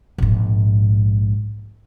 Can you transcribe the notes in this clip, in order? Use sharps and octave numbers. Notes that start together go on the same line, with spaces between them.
A#1 G#2